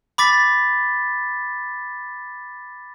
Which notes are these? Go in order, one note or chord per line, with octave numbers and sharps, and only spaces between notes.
B5 D6 A6 B6